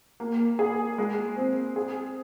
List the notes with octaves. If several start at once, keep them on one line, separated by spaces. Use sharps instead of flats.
A#3
G#4
G#3
C4
G#4